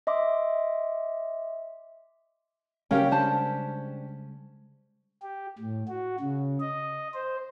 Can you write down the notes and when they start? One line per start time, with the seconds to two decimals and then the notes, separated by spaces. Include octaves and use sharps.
0.07 D#5 E5 C6 D6
2.91 C#3 G3 G#3 C#4 G4 A#4 F5 G5
3.11 D4 C5 A5
5.22 G4
5.59 A2
5.88 F#4
6.20 C#3
6.60 D#5
7.14 C5